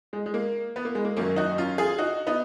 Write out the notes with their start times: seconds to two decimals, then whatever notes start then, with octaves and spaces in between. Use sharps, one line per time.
0.13 G#3
0.26 G#3
0.34 A#3
0.76 B3
0.85 A#3
0.95 G#3
1.05 A#3
1.17 F#2 D#3 F#3 A#3 C#4
1.36 D#4 F#4
1.58 C#4 F4
1.78 F4 G#4
1.98 D#4 F#4
2.27 B3 D#4